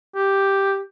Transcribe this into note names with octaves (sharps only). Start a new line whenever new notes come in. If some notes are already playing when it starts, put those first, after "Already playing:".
G4